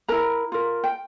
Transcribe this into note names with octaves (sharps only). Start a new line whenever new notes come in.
E4 A#4 A#5
F4 A#4
G5